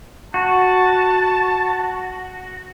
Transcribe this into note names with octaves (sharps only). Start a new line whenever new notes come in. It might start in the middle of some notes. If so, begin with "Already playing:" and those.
F#4 A5